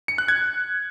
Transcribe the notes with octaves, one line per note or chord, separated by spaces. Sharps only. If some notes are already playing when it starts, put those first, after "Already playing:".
C#7
F#6
G#6